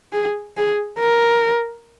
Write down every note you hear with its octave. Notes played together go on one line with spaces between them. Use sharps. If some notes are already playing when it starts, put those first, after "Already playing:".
G#4
G#4
A#4